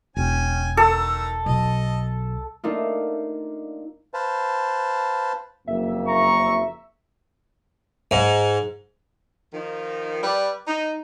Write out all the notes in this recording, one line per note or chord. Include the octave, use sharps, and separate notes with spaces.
E1 C#4 G5 G#5
D#3 A4 A#5 E6
B1 D#5 A5
A3 A#3 D4 D#4 F4
B4 C5 F5 A5
F#1 F2 A#3 E5
A#5 C#6
G#2
D#3 F3 D#4
G3 B4 D5
D#4